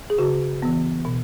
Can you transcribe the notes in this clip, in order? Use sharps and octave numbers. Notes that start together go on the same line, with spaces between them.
G#4
C#3 F#4
E3 B3
B2